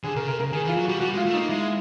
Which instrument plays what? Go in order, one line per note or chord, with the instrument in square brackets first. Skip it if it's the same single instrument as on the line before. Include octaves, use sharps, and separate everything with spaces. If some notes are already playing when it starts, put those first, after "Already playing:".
[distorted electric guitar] D3 [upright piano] G#4
[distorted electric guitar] C#3 [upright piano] A#4
[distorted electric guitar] C3 [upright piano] A#4
[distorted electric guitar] C#3 [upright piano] A#4
[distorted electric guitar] D#3 [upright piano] G#4
[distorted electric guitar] E3
[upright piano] F4
[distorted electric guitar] F#3
[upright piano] F#4
[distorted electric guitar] G3
[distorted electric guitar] G3 [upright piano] F#4
[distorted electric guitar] G#3
[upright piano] F4
[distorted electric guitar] A3
[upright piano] D#4
[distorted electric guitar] A#3
[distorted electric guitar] G#3 [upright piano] E4